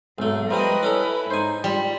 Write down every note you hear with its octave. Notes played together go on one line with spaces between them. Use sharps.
B1 G#2 A3
F3 G3 D4 A#4 B4 D#5
C#4 E4 A4 A#5
G#2 D#4 C5 G#5
G3 F4